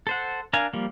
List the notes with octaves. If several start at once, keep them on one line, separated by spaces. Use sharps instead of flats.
A4 C5 F#5
D4 A#4 F5 G#5
F3 G3 A#3